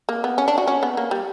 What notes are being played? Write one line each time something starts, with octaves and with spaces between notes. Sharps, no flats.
A#3
B3
C#4
D4
F#4
C#4
B3
A#3
G3